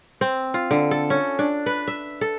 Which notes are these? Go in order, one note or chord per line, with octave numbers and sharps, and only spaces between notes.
C4
F4
D3
A4
C#4
D4
B4
E5
A4